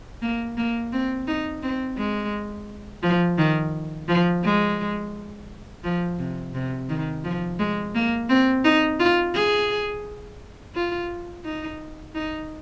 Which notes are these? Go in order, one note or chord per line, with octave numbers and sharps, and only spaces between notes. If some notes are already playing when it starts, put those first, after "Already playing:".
A#3
A#3
C4
D#4
C4
G#3
F3
D#3
F3
G#3
F3
C3
C3
D#3
F3
G#3
A#3
C4
D#4
F4
G#4
F4
D#4
D#4